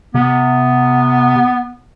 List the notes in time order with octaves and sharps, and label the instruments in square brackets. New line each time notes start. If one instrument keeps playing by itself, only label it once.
[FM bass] C3 [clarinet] B3